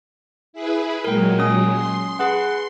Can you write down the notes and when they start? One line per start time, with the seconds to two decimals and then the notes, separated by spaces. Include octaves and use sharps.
0.53 E4 G#4 B4
1.04 A#2 F#3 G#3 A#4 G5
1.39 C#4 D#6
1.71 C6
2.19 G#4 B4 F#5